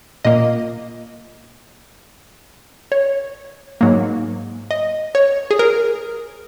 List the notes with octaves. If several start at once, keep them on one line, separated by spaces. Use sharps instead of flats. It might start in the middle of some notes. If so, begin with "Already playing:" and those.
A#2 A#3 D#5
C#5
G#2 F#3 A#3
D#5
C#5
G#4
A#4